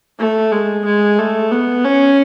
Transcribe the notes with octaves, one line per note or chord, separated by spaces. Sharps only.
A3
G#3
G#3
A3
B3
C#4